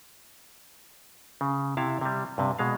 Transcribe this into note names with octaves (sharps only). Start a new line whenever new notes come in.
C#3
C3 E4 F5 A5
C3 G3
G2 C3
B2 G#3 F5